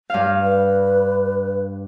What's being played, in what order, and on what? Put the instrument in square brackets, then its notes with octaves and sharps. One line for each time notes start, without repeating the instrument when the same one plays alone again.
[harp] G2 F5
[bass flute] B4